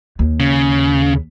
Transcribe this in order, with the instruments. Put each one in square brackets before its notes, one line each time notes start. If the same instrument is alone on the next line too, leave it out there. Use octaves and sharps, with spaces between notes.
[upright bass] D#2
[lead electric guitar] C#3